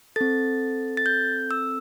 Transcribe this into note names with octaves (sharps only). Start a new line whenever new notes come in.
C4 A4 A6
A6
G6
E6